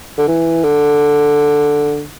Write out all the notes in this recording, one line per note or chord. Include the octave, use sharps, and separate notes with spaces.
D3
E3
D3